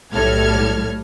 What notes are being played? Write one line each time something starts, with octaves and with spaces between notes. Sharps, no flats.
B1 A2 G3 A4 F6 G#6